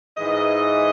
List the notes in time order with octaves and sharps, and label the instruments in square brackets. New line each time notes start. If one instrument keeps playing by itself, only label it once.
[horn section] G#2 E3 D#5